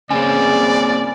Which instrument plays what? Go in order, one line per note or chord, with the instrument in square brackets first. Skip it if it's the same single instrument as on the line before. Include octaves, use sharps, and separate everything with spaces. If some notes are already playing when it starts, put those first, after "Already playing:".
[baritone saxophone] C#3 [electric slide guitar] A#3 C4 C#4 [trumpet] D5 [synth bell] G#5